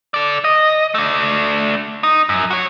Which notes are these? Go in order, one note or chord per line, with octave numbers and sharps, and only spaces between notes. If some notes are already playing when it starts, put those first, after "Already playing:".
A4 D5
D#5
A3 D4
D#4
F#2
F#4 C#5